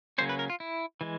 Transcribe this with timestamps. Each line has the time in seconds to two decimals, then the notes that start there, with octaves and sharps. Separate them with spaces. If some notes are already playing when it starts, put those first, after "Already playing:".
0.18 C#3 F#3 A#3 C#4 C5
0.29 B4
0.39 A#4
0.50 F4
0.60 E4
1.01 E3 G#3